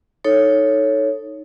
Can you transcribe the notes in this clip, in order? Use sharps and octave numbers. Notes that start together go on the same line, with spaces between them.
D#4 A4 C#5